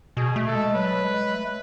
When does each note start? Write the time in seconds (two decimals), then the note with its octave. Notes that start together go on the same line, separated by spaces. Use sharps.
0.17 B2 G#4
0.36 A3
0.47 A4
0.55 G#3
0.75 F#3 B4
1.04 G#3
1.34 A3